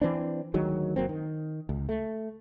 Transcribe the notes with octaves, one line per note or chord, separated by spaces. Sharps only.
E3 C4 D4
D2 D#3 F#3 G#3
F#1 F#3 A#3 C4
D#3
C#2
A3